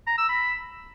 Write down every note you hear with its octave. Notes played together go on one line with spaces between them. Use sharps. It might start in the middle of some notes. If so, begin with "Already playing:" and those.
A#5
E6
B5